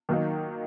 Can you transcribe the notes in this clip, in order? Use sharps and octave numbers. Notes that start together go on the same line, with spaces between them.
D#3 F#3 A#3 D#4